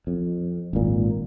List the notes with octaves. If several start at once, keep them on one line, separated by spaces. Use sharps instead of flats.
F2
G#1 A#2